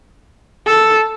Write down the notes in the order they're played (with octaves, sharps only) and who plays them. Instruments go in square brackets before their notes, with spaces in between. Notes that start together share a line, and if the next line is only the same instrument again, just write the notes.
[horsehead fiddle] A4